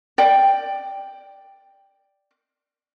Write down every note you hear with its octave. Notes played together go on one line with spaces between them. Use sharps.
D5 G5